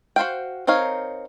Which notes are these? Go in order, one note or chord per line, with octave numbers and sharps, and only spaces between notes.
F#4 C5 F5 G5
C4 D#4 A#4 C#5 F5